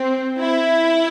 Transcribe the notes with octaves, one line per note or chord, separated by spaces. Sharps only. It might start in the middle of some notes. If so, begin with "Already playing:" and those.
Already playing: C4
E4